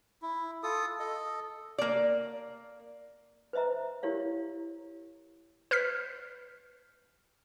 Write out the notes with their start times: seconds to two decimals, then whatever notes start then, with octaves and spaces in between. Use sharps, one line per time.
0.22 E4
0.63 F4 A4 D#6
1.00 A4 D#5
1.78 A#3 D5
3.53 B4 C5 D#5 E5 A#5
4.03 E4 G4 A#4 C#5 F5
5.71 B4 F6 G6 B6